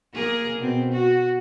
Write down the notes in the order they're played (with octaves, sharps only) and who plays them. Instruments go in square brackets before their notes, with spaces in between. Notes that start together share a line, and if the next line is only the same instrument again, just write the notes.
[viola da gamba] A#3 G#4 A#4
B2 C4
F#4